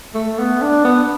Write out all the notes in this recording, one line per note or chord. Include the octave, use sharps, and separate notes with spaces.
A3
B3
D4
B3